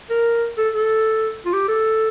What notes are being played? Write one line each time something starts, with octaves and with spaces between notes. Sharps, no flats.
A#4
A4
A4
F4
G4
A4